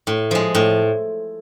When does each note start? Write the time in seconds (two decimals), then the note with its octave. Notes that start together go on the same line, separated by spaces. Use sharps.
0.07 A2
0.31 F3 G#3
0.55 A2